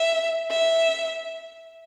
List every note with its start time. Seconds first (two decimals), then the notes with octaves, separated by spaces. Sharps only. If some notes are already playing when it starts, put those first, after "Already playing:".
Already playing: E5
0.51 E5